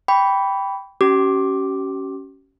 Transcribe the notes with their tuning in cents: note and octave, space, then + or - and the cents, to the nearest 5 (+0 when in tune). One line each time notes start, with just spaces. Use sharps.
G5 +0 B5 +0 D6 -45
C#4 +0 G4 -45 D6 +0